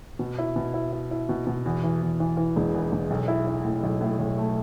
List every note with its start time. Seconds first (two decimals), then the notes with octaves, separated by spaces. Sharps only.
0.19 B2
0.39 E4
0.56 B2
0.74 E4
0.93 E4
1.11 E4
1.29 B2
1.47 B2
1.66 E2
1.84 E3
2.02 E2
2.20 E3
2.37 E3
2.56 E1
2.74 E2
2.92 E1
3.10 B1
3.28 E4
3.47 E4
3.65 A2
3.83 B1
4.01 A2
4.19 B1
4.38 A3